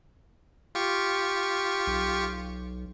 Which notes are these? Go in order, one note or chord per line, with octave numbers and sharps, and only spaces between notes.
F4 G4 C#6
B1